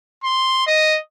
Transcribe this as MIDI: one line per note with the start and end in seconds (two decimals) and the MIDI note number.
0.24 0.67 84
0.67 0.99 75